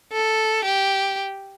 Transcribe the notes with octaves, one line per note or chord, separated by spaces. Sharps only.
A4
G4